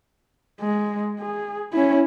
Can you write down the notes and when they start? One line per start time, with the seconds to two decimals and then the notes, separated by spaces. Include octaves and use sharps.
0.61 G#3
1.20 G#4
1.73 C#4 E4